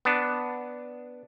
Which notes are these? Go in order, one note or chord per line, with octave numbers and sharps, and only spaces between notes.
B3 D4